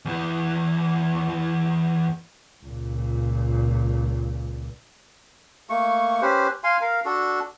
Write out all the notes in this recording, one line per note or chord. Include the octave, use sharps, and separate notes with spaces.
E2 E3
C#2 A#2
A3 A#3 C#6
C#4 G4 B4 C5
F5 G#5 C6
A#4 F5
D4 F#4 A4